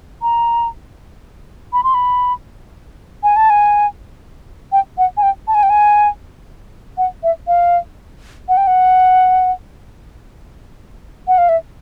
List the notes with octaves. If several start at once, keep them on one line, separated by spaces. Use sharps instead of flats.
A#5
B5
C6
B5
G#5
A5
G#5
G5
F#5
G#5
G5
A5
G#5
G5
G#5
F#5
E5
F5
F#5
G5
F#5
F#5
F5
E5